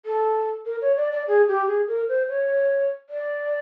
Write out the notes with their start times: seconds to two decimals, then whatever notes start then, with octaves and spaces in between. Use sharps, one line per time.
0.06 A4
0.66 A#4
0.82 C#5
0.97 D5
1.12 D5
1.28 G#4
1.48 G4
1.67 G#4
1.88 A#4
2.09 C5
2.29 C#5
3.10 D5